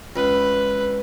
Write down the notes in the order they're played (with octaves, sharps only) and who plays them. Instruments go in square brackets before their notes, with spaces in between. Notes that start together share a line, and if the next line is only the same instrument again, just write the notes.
[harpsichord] C#2 [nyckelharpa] B4